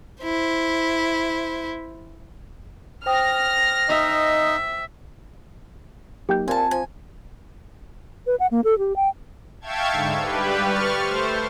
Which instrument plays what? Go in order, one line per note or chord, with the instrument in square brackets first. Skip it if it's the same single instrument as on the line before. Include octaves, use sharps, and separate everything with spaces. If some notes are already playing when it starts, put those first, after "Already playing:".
[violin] E4 C5
[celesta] C5 G5 D#6 [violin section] F6 A#6
[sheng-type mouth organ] D#4 D#5 [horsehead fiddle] E5
[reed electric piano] F#3 A#3 D#4 [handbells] G4 G5 G6
[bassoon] A#2 [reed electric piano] C4 F4 G#6 [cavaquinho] G#5 A5
[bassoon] F3 [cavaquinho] G#5
[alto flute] B4
F#5
A#3
A4
G4
G5
[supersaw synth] E5 F5 G5 A5 C#6 G#6
G#2 D3
G3 G4 B4
C#6 F6 A6
A3 C5